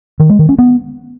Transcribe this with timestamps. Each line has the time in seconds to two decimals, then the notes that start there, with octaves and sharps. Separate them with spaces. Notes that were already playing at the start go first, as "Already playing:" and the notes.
0.20 D#3
0.29 G#3
0.39 D#3
0.49 C#4
0.59 B3